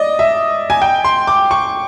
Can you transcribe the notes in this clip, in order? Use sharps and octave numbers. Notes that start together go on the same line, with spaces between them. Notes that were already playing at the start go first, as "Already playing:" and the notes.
Already playing: D5 D#5
E5
G#5
G5
C6
D6
C#6